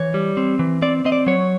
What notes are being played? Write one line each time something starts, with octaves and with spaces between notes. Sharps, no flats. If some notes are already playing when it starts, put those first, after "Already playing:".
Already playing: E3 C#5
G3
C4
E3
C4 D5
C4 D#5
D5
F#3 C#5